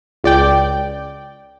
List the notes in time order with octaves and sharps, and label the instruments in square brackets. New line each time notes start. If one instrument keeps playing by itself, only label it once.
[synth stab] C#2 D5 G5